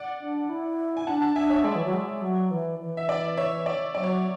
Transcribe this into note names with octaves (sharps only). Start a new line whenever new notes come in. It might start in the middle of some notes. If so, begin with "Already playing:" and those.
Already playing: D5 F#5
D4
E4
G#5
D4 F#5 A5
F#5 A5
D4 E5 G#5
C#5 E5
G#3 D5
E3
F#3
G#3
F#3
E3
E3
E5
D5
C#5 E5
D5
F#3 D5
C#5